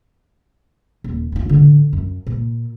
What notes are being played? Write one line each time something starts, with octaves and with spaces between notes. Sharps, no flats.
D#1
F1 F4
A1 D3
F#2
A#2